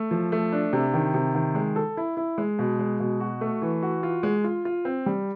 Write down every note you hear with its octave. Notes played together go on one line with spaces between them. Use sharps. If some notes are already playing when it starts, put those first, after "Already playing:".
Already playing: A3
F3
A3
D4
C3
D#3
C3
D#3
G#3
A4
E4
E4
G#3
B2
G#3
B2
F#4
A3
E3
F#4
F4
G#3
F4
F4
C4
G3